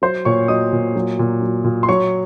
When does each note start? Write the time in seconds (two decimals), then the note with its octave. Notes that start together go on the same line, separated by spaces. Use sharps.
0.02 F#3 C5 C6
0.25 A#2 C#5 C#6
0.48 F#3 D#5 D#6
0.73 A#2
0.96 F#3
1.19 A#2
1.42 F#3
1.64 A#2
1.83 C6
1.88 F#3 C#5 C#6